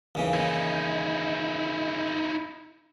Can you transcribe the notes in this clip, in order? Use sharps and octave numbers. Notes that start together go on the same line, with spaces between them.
D#2 C#3 E3
D#4 E4